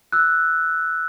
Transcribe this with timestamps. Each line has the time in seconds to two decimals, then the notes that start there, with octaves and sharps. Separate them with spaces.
0.12 E6 F#6